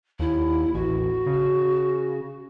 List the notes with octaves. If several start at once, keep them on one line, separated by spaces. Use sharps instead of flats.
D#2 E4
A1 F#4
C#3